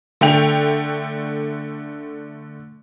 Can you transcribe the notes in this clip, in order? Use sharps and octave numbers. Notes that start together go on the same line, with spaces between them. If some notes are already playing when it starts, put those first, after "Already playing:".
D3 A3 G5 F7